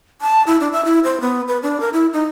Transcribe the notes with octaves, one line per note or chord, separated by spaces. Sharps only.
A5
E4
D4
E5
E4
C5
B3
B4
D4
A#4
E4
D#4